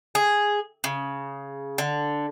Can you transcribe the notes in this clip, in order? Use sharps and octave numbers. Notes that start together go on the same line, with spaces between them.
G#4
C#3
D3